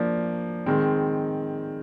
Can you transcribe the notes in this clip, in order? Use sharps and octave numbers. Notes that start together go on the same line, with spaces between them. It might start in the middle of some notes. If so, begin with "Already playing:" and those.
Already playing: F3 A#3 D4
D#3 G#3 C4